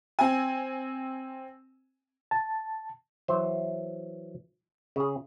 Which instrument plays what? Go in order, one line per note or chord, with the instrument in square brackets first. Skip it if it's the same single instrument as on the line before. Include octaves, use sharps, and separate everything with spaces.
[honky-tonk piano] C4 G#5
[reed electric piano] A5
[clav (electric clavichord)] E3 F#3 C5
C#3 G#4